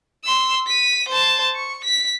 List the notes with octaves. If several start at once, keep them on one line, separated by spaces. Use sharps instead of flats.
C6 E6
B6 D#7
C5 A5
C#6
B6